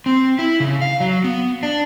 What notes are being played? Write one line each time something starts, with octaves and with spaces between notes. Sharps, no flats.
C4
E4
C#3
F5
F#3
B3
D4